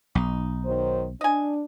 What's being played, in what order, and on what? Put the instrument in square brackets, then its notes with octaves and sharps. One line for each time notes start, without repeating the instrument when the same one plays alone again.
[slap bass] B1 [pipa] D#4
[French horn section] D#3 F#3 C5
[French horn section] D4 [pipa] D#5 G#5